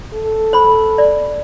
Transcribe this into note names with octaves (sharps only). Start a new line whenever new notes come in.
A4
C5 B5
D5